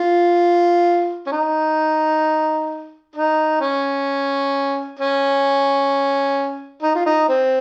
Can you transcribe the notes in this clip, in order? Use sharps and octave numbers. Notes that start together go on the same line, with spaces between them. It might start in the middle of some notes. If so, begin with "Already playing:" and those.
Already playing: F4
C#4
D#4
D#4
C#4
C#4
D#4
F4
D#4
C4